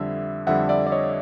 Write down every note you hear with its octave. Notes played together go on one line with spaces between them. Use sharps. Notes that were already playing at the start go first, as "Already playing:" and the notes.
Already playing: F2 D3 G3 E5
F2 D3 G3 E5 F#5
D5 E5
D5
C#5 D#5